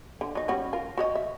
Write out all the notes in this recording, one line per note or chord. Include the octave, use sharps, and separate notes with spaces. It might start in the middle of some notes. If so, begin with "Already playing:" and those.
D3
F#3 D#4
G3 C#4 F#4
F4 A#4
F#4 C#5 D#5
E5